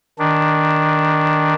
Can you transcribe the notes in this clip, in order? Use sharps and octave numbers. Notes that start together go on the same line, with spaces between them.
D#3 D4